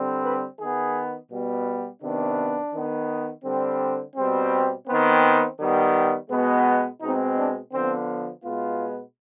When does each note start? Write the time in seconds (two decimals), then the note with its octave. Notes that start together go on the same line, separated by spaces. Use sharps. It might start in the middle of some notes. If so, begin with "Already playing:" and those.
Already playing: D3 G3 C4
0.24 B4
0.59 D#3 B3 G#4
1.31 B2 G3 B3
2.02 C3 D#3 B3 D4
2.73 D#3 B3
3.45 D3 G3 C4
4.16 B2 G3 C4
4.87 D#3 B3 C4
5.59 D#3 G3 B3
6.30 B2 G#3 B3
7.01 B2 G#3 C4 D#4
7.38 D4
7.73 D3 F3 B3 C4
8.44 B2 G#3 B3 F4